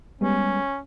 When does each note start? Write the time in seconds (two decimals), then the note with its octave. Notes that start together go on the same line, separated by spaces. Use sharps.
0.21 G3 G#3 B3 C#4